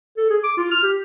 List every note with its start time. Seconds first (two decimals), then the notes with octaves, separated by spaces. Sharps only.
0.17 A4
0.30 G#4
0.44 D6
0.58 F4
0.71 F6
0.83 G4